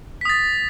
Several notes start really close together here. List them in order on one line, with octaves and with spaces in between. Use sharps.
B6 D#6 A6